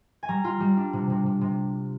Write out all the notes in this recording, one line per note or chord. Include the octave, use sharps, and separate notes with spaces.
G#5
G3 A#5
F4
G3
D4
C3
C3
C3
C3